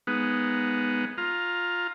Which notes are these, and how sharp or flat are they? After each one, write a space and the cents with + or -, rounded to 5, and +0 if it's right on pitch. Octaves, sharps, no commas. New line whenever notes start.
G#3 +0 B3 +0 D#4 +0
F4 +10 A#5 +0